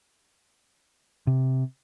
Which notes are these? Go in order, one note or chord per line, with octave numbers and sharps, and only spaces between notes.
C3